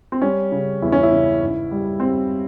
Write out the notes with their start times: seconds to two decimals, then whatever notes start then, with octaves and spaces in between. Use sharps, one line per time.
0.12 C4
0.22 G3 C#4
0.52 C#3
0.82 E2 E4
0.92 C#4
1.03 E4
1.12 C#3
1.41 G#2
1.71 G3
2.00 G3 C4